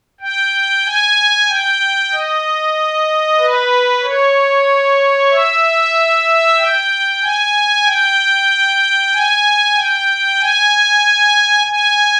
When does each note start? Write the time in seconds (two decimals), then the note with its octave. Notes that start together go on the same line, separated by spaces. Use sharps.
0.21 G5
0.85 G#5
1.49 G5
2.12 D#5
3.39 B4
4.02 C#5
5.30 E5
6.58 G5
7.21 G#5
7.85 G5
9.13 G#5
9.75 G5
10.40 G#5
11.67 G#5